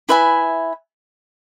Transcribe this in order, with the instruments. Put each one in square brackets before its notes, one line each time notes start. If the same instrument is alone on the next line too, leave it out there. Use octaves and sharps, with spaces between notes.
[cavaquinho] E4 B4 E5 G#5